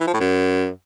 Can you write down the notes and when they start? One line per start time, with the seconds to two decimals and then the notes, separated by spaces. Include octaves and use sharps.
0.01 E3
0.07 F3
0.14 A2
0.20 F#2